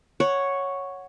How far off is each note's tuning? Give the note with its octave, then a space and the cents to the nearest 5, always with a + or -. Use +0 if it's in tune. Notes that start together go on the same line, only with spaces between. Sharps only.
C#5 +0 F#5 -5